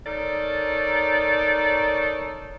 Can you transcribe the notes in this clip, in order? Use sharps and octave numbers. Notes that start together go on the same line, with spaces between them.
D#4 A4 A#4 C#5 D5